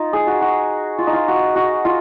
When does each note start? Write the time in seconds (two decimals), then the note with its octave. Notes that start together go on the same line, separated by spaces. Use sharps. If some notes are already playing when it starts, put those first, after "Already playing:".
Already playing: D#4 F4
0.13 G#4
0.27 F#4
0.41 F#4
0.98 F4
1.07 D#4
1.13 F4
1.28 F#4
1.55 F#4
1.85 F4